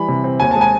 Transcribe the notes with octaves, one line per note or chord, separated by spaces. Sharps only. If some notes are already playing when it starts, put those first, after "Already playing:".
Already playing: E3 G3 B5
C3
C4
D#2 G#5
G#3 A5
G#5